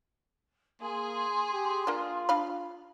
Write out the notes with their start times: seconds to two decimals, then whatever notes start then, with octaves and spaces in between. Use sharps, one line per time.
0.81 A#3 G#4 C6
1.52 G4
1.87 A#3 D4 F4
2.29 D4 F5 B5